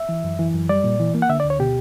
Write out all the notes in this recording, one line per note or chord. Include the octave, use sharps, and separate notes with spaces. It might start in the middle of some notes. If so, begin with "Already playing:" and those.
Already playing: E5
E3
F#2
E3
F#2
G3 D5
A#2
E3
A#3
F#5
D3 E5
D5
D2
C#5
B2 G4